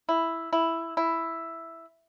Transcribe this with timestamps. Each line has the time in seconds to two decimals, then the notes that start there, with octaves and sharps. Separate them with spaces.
0.09 E4
0.53 E4
0.97 E4